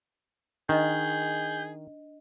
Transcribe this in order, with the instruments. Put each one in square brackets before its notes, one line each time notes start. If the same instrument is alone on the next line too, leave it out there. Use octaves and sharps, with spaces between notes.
[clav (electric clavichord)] D#3 [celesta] D4 D#5 [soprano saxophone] G#4 [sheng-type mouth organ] G6